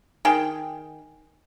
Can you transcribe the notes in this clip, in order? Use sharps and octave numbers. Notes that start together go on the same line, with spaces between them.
D#3 G#4 G5